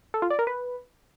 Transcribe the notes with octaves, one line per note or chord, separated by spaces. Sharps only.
A4
F4
D5
A#4
B4